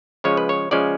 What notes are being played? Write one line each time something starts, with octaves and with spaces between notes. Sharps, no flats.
C#3 F3 G#3 C#4 C#5
B4
C#5
C#3 F3 G#3 C#4 D5